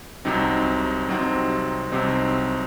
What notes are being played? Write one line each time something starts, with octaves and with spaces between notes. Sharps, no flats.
C2 C3 F#3 C4 D#4
C2 C3 F#3 C4 D#4
C2 C3 F#3 C4 D#4